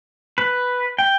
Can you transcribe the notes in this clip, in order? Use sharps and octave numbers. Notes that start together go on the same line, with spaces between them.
B4
G5